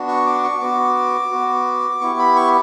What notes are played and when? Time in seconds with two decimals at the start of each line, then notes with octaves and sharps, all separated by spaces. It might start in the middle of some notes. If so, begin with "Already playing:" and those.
Already playing: B3 D4 F#4
0.08 C#6
0.26 D6
0.44 C#6
0.60 B3 F#4 D6
1.31 B3 F#4
2.01 B3 E4 G4 C#6
2.19 B5
2.36 C#6